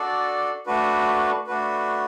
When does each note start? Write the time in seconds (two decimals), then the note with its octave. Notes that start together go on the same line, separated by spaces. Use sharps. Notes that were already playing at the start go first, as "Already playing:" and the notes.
Already playing: D4 F#4 A4 D5
0.66 A3 D4 F#4 B4
1.47 A3 D4 F#4 B4